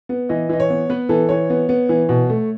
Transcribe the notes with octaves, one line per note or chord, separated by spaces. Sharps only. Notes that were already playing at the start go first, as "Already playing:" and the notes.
B3
E3 D#5
E3 D#5
C#5
B3
B3 B4
E3 A4
E3 C#5
B3
B3
E3
B2
A3